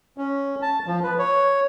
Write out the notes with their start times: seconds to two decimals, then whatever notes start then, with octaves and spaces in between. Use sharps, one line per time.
0.18 C#4
0.62 A5
0.87 F3
1.03 B4
1.19 C#5